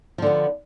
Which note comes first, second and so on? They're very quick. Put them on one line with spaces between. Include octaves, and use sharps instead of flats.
F3 D3 B3